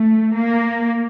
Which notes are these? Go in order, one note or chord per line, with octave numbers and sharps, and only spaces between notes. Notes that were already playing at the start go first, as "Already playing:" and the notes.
Already playing: A3
A#3